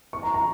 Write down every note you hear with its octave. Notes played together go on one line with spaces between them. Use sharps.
C#6
A#5
A#5